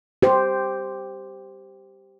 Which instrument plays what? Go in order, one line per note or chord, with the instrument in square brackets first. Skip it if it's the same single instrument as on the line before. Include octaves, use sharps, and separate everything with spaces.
[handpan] G4 C5